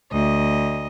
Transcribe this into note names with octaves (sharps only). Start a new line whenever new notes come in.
D2 D#5